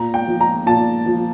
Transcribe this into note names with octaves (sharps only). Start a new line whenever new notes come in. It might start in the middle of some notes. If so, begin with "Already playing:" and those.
Already playing: A#2 A#5
G5
F3
A#5
A#2 A5
F3